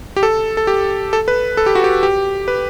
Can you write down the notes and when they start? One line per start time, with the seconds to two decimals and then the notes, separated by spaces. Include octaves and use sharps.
0.16 G4
0.23 A4
0.57 A4
0.67 G4
1.13 A4
1.28 B4
1.57 A4
1.66 G4
1.75 F#4
1.84 G4
2.03 G4
2.48 B4